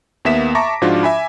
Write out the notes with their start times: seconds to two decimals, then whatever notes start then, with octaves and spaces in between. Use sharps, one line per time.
0.25 D#2 A#3 B3 E5 B6 E7
0.55 E5 A5 A#5 C#6 D6 A#6
0.82 G#2 F3 D4 F4 F#4
1.03 E5 G#5 B5